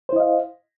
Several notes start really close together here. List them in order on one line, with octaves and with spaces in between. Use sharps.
C5 E4 D#5 F5